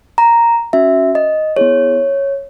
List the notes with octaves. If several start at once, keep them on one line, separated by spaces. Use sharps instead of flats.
A#5
C#4 F#4 E5
D#5
B3 E4 G#4 C#5